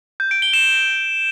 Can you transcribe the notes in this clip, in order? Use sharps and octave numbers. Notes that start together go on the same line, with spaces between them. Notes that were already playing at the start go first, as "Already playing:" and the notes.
G6
D7
G7
E7